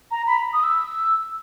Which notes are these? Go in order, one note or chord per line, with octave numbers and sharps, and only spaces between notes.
A#5
B5
D#6
E6